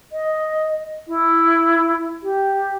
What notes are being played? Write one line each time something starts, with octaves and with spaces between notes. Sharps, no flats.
D#5
E4
G4